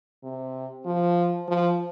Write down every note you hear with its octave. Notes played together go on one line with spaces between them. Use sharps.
C3
F3
F3